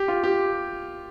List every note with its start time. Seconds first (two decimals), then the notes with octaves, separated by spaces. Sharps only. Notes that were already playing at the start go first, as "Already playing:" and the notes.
Already playing: G4
0.08 F4
0.24 G4